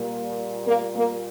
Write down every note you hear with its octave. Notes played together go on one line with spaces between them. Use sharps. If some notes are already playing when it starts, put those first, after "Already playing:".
Already playing: A#2 G3 A#3
A#3
A#3